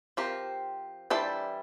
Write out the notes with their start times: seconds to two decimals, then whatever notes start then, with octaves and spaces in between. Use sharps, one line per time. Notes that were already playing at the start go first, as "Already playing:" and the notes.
0.17 F3 C4 G4 A#4
1.10 E3 G3 D4 A4 C5